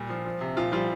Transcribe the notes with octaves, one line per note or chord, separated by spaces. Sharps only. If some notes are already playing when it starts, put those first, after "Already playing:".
Already playing: A#2 G3
F3
F3
C3
A#2 F3 F4
F3 G3 F4